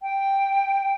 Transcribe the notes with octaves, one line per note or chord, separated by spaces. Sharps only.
G5